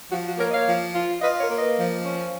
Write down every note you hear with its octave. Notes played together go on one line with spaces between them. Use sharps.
F3 F#4
F#4
A#3 A#4 C#5
D#5
C#5 F5
F3
F4
F4 B4 D#5
A#4 C#5
A#3
B4 D#5
F3
C#4